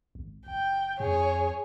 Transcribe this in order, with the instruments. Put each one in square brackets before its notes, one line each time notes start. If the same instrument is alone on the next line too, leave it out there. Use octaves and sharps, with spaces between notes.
[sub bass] G#1
[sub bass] F#1 [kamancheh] G5
[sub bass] F2 [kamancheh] G#4 C#5